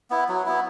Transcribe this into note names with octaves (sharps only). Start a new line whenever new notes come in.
B3 E4
F#3
B3 E4